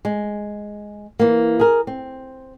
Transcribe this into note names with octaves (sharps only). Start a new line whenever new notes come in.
G#3
E3 A#3
G#4 A#4
C4